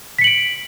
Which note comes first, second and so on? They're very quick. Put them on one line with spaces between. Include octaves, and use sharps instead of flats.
B6 C#7 F#7 D7